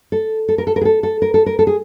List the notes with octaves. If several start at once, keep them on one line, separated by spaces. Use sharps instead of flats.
A4
A4
A#4
A4
A#4
G#4
A4
A4
A#4
A4
A#4
A4
G#4